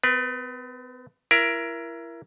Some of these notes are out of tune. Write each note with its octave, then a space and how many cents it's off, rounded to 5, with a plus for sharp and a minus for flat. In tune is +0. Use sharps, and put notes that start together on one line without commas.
B3 +45 B4 -25
E4 +30 A#4 +15